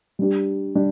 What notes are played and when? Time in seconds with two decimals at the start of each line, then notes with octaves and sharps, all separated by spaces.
0.19 G3 D4 G4
0.75 G3 D4 G4